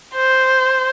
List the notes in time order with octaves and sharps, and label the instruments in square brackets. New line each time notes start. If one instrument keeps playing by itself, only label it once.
[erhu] C5